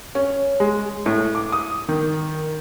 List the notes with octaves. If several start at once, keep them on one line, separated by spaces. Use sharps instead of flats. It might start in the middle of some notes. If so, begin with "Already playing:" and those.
C#4
G#3
A2
D6
D#6
D#3